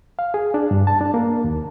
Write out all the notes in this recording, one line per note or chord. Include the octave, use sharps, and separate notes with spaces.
F5
G#4
D4
G2
A5
D4
A#3
D#2